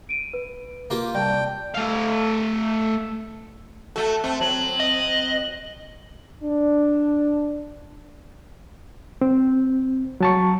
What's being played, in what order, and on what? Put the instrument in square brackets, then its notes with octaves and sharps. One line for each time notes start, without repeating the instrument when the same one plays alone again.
[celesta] D7 D#7
B4
[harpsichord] A#3 F4 G4
[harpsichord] C2 [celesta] D5 A5 [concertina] G5
[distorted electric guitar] A3 F5
[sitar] A3 F#4 [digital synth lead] A4
[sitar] A3 [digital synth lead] C4
[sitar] F#3 [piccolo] F#7
[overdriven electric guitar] D#5
[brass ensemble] D4
[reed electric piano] C4
F#3 A5 C#6